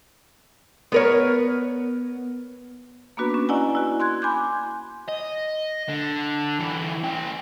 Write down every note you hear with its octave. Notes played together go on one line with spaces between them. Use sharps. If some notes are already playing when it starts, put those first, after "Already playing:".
B3 A#4 C#5
A#3 B3 D4 F#4 B4
C#4
E4 D5 D#5 F#5 G#5 A#5
E4 F#4
C6 F#6 G#6
G#5 B5 C6 D6 G6
D#5
D3
D3 E3
C#4 G5